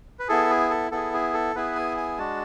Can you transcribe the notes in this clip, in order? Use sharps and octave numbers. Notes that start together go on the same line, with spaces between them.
B4
B3 E4 G#4 A4
G#4
A4
B3 E4 G#4 A4
G#4
A4
B3 E4 G#4 B4
G#5
G#5
G#3 D4 F#4 A5